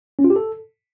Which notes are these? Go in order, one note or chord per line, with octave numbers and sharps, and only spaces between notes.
C#4
F4
G4
A4